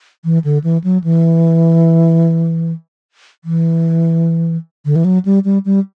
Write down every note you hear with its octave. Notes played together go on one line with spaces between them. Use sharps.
E3
D3
E3
F#3
E3
E3
D3
E3
F#3
G3
G3
G3